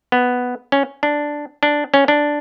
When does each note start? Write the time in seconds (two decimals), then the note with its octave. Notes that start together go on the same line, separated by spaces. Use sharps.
0.12 B3
0.72 C#4
1.03 D4
1.63 D4
1.94 C#4
2.08 D4